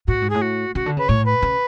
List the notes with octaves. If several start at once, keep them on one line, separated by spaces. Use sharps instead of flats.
A2 F#4
G#2
A2 G#4
F#4
C#3 F#4
D3
C#3 B4
A2 C#5
B4
C#3